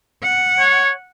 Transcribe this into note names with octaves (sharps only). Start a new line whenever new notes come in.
F#5
C#5